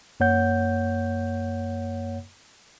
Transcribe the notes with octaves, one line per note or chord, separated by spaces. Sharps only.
F#2 A#3 C#5 F#5 G6